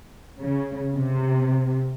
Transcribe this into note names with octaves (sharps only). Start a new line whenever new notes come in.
C#3
C3